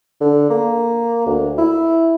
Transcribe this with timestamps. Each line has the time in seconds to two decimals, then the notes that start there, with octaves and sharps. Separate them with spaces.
0.21 D3
0.50 A#3
1.26 D2
1.58 E4